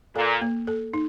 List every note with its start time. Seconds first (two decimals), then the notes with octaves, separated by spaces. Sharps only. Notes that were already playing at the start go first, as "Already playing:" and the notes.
0.15 A#2 A4
0.41 A#3
0.67 A4
0.93 D#4